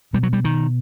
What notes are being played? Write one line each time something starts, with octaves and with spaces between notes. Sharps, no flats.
B2 G3
F#3
G3
D#3